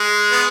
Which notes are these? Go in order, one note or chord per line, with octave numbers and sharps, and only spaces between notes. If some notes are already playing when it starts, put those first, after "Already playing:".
Already playing: G#3
B3